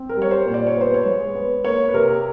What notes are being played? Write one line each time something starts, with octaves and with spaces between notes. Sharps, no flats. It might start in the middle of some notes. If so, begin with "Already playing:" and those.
Already playing: C4
A#4
G3 C#5
C5
A#2
D5
C#5
B3 C5
C#5
G#3
B3
A#3 C#5
B4
C3 A#4